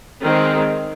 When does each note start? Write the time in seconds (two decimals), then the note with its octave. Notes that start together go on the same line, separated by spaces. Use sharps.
0.23 D#3 G#3 C4